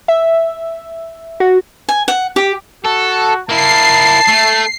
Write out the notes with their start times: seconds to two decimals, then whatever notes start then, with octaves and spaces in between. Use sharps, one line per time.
0.08 E5
1.40 F#4
1.89 G#5
2.08 F#5
2.36 G4
2.85 F#4 A4
3.49 A#3 E4 A5 C7
4.28 A3